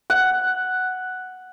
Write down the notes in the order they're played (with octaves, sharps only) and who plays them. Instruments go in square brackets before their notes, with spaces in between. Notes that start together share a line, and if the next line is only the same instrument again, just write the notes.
[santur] F#5